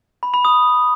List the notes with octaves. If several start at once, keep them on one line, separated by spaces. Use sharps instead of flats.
B5
B5
D#6